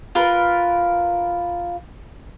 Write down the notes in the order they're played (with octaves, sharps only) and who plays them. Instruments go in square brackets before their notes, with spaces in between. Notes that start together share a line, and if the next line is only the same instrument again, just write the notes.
[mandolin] F4 A#4 B4